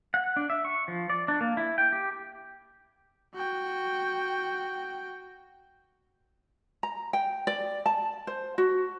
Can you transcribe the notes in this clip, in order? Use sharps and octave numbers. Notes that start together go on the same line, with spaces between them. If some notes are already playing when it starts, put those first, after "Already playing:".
F#5
D4
E5
C#6
F3
D5
D4
A#3
E4
G5
G4
F#4 G5
A#5
G5
D5
A5
C5
F#4